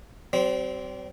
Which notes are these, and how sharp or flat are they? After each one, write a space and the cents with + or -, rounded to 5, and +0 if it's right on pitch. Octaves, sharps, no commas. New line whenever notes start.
G3 -45 C4 -15